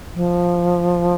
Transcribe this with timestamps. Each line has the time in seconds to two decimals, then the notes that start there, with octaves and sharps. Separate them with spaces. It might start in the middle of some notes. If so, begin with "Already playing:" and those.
0.15 F3